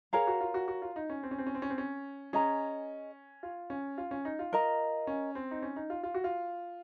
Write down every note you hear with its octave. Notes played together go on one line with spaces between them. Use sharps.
G#4 A#4 C#5 F5 A#5
F#4
F4
F#4
F#4
F4
D#4
C#4
C4
C#4
C4
C#4
C4
C#4
C4
C#4
C#4 G#4 D#5 A#5
F4
C#4
F4
C#4
D#4
F4
A#4 D#5 A#5
C#4
C4
D#4
C#4
D#4
F4
F4
F#4
F4